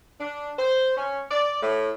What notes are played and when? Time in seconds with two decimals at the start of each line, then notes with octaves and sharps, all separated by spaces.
0.19 D4
0.58 C5
0.96 C#4
1.31 D5
1.62 A2